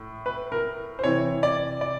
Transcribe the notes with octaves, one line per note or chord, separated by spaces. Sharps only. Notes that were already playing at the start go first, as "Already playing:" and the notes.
Already playing: A2
B4
A#4
C5
C3 E3 C#5
D5
D5